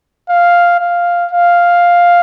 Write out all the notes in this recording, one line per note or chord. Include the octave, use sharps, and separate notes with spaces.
F5
F5
F5